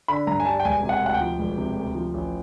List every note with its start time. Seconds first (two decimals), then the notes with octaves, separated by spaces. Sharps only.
0.08 D3 B5
0.27 G2 A#5
0.40 G#5
0.45 G3 A5
0.60 G5
0.64 E1 G#5
0.83 C3
0.89 F#5
1.01 D2 F#5
1.14 G5
1.20 F3
1.39 E1
1.58 C3
1.76 D2
1.95 F3
2.14 A1